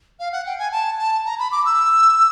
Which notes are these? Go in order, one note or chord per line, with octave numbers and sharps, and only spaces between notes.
F5
F#5
G5
G#5
A5
A5
A#5
B5
D6
E6